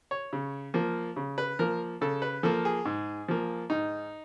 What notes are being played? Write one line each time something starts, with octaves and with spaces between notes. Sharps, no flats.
C#5
C#3
F3 A#3
C#3
B4
F3 A#3 A#4
C#3 A4
B4
F3 A#3 A4
G#4
G#2
F3 A#3
G#2 D#4